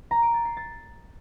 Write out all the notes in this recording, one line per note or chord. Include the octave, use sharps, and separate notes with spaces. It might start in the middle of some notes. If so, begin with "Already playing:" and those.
A#5
D7
A6
C7
A6